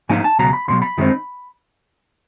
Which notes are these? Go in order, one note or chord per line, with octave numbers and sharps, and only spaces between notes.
G#2 F3 A#3 D#4 G#5
A5
C#2 B2 F#3 A#5
B5
C#2 B2 F#3 C6
B5
F#2 D#3 G#3 C4 D#4